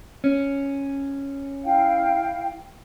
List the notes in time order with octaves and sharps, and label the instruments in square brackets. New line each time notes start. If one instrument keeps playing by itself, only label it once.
[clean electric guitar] C#4
[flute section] E4 F5 G5